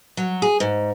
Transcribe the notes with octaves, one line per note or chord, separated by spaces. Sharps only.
F#3
G#4
G#2